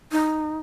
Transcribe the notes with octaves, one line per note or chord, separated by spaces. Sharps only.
D#4